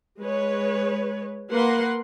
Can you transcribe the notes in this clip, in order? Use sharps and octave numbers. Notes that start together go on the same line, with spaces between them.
G#3 B4 C#5
A#3 A#4 B4 F#5 C6